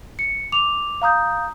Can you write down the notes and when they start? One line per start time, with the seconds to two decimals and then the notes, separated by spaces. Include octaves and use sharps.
0.19 C#7
0.52 D6 F7
1.02 F5 A#5 D#6 G6